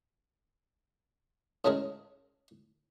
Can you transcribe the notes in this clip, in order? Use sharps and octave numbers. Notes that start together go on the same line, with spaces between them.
A2 C#3 G#3 A3 G#4 A#4